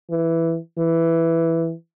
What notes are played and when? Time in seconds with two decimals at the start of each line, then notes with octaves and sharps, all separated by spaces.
0.10 E3
0.78 E3